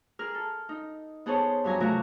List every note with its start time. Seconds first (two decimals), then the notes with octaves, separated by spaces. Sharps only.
0.19 G#4 A#4 F6
0.35 A4
0.69 D#4
1.26 B3 G#4 A4 C5 C#5 A5
1.64 G2 F#3 G#5 A#5
1.80 C3 F3 F#3 A3 F#4 A#4